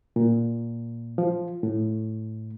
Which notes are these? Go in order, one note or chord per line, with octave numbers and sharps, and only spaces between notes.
A#2
F3
A2